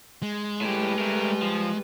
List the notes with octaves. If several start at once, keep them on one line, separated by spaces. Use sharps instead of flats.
G#3
A2 G3 G4 B4
A3 A#4
F3